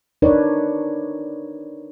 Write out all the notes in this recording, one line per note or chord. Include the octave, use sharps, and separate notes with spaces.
D4 D#4 A#4 B4 C#5 D5